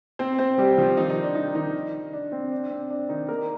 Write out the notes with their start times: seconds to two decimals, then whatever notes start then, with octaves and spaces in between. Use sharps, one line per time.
0.19 C4 C5
0.39 C4 C5
0.58 G3 G4
0.78 F3 F4
0.97 D#3 D#4
1.10 D#3 D#4
1.23 D4
1.35 D#3 D#4
1.55 D#3 D#4
2.13 D4
2.32 C4
2.52 D4
2.70 C4
2.90 D4
3.09 D#3 D#4
3.29 A#3 A#4